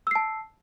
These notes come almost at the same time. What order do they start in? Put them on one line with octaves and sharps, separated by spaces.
E6 C7 A5